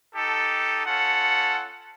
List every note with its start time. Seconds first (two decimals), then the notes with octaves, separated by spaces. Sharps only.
0.15 D#4 G4 A4
0.86 C#4 F4 A4 F#5